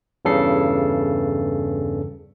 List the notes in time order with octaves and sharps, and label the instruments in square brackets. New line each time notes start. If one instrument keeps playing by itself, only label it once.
[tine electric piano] E2 G2 C#3 A4 C7